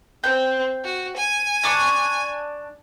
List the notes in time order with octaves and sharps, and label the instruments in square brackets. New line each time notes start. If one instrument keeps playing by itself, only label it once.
[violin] C4 [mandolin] G5
[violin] F#4
G#5
[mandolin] D4 C#6 D6